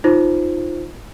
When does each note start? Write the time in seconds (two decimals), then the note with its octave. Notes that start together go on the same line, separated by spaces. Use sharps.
0.04 D#4 F4 C5